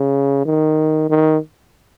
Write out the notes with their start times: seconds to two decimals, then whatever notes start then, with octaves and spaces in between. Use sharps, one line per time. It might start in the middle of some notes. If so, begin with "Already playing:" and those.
Already playing: C#3
0.46 D#3
1.10 D#3